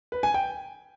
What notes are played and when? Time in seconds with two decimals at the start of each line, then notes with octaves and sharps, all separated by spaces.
0.12 B4
0.23 G#5
0.34 G5